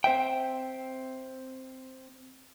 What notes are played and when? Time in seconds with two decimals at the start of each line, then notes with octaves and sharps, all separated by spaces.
0.04 C4 C5 E5 G5